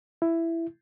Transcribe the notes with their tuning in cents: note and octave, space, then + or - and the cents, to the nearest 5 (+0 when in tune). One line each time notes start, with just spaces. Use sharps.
E4 +10